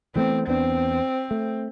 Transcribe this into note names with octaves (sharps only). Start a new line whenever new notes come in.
E3 A3 B3 C4
E2 B3 C4 D4
A3